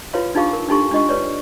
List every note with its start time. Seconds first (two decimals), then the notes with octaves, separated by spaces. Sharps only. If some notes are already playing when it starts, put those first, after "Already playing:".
0.13 E4 F4 B4 C#5 F5 C6
0.35 D4 D#4 F4 G#4 F5 C#6
0.53 A#4
0.69 D4 D#4 G4 A4 C6 C#6
0.91 D4 F4 D#5 C#6
1.09 B4 C#5 D5